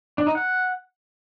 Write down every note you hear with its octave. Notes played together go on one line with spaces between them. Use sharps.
D4
D#4
F#5